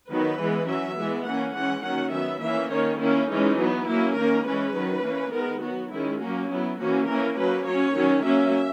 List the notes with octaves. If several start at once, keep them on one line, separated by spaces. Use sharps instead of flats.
D#3 F#3 B3 B4
E3 G#3 B3
F#3 C#4 E5
E3 G#3 B3
E3 A#3 C#4 F#5
E3 G#3 C#4 F#5
D#3 F#3 A#3 C#4 F#5
F#3 B3 E5
E3 A#3 C#4 E5
D#3 A#3 C#4 C#5
D#3 A#3 C#4 E4
E3 G#3 C#4 D#4
F#3 B3
F#3 A#3 C#4 E4
D#3 A#3 C#4 A#4
E3 G#3 C#4 B4
D#3 F#3 C#4
E3 A#3 C#4
D#3 G#3 B3 A#4
F#3 B3 F#4
D#3 G#3 C#4 E4
F#3 A#3 C#4 F#4
F#3 B3 E4
E3 A#3 C#4 F#4
E3 A#3 C#4 A#4
F#3 A#3 C#4 B4
F#3 C#4 C#5
D#3 F#3 C#4
F#3 A#3 C#4 E5